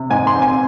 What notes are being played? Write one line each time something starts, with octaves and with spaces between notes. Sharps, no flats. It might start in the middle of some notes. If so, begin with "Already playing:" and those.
Already playing: C3
G#2 G#5
C6
C4
G#5